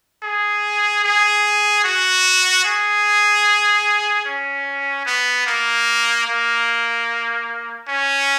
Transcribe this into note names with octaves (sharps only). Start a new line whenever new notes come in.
G#4
G#4
F#4
G#4
C#4
B3
A#3
A#3
C#4